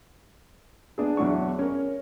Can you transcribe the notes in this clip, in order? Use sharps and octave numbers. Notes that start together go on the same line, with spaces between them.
B3 D4 G#4
E2 F#3 D4 C#6
C#4 A#4